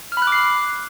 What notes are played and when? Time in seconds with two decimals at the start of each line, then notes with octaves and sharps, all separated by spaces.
0.12 F6
0.17 B5
0.22 F#6
0.27 D6
0.32 C7